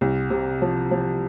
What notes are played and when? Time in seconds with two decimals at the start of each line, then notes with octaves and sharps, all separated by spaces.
0.01 C2
0.30 C3
0.62 F3
0.91 F3